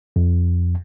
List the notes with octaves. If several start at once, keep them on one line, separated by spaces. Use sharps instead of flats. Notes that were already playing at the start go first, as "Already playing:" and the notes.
F2